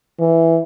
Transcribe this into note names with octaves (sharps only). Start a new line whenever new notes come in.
E3